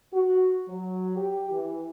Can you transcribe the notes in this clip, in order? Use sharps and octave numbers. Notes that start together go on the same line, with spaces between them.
F#4
F#3
G4
E3